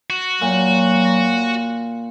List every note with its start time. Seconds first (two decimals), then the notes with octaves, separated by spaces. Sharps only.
0.10 F#4
0.41 A#2 F#3